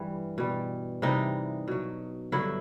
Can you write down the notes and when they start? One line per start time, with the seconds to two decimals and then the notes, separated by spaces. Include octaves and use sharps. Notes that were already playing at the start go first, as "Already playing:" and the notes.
Already playing: G2 E3 G3
0.38 B2 G3
1.02 C3 E3 G3 D#4
1.68 B2 F#3
2.32 G2 D3 F#3 E4